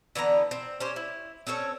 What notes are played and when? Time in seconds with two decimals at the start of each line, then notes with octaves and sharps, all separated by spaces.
0.15 D3 E3 B3 A#5
0.51 C4
0.80 C#4 G4 C5 C#5
0.96 E4
1.47 C4 C#4 A4 C#5